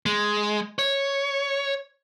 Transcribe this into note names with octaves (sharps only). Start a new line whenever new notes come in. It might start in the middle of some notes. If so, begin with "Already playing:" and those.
G#3
C#5